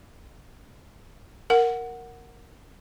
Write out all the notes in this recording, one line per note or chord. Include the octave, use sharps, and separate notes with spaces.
A#4 F#5